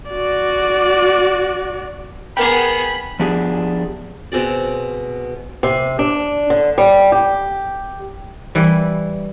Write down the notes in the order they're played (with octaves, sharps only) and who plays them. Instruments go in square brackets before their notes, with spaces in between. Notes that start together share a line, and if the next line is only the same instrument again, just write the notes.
[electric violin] F#4 D5
[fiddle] B3 G#4 [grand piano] A#4 G5 [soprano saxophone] B5
[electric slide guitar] F3 B3 D4 G4 G#4
[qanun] B2 C4 G#4 D5
[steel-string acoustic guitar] C3
D4
D3
G3
G4
[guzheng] E3 G3